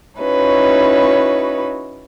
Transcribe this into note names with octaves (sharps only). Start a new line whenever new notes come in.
C#4 D#4 E4 F#4 B4 C#5